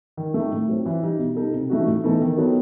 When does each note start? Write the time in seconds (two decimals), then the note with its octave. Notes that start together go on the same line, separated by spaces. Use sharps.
0.17 D#3
0.34 A3 D#4
0.52 A2
0.69 F#3 C4
0.86 E3
1.02 G3 D#4
1.19 B2
1.36 G3 D#4 A4
1.53 C3
1.70 E3 A3 D#4 F#4
1.87 A2
2.04 E3 B3 D#4 A4
2.22 D#3
2.37 F#3 B3 D#4 A4